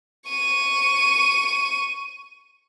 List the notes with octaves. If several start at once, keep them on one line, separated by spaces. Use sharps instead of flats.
C#6 D#7